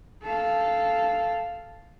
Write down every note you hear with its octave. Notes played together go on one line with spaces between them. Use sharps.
A4 F5